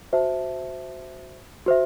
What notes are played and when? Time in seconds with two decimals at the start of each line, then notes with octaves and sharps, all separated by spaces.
0.13 F#4 C5 E5 A5
1.66 F#4 C5 E5